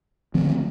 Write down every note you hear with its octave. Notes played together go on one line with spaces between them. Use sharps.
D3 F3 A3 C4